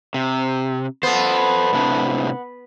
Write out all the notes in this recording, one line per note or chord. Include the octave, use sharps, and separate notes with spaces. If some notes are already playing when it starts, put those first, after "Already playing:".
C3
B3 A4 C5
A2 C3 D4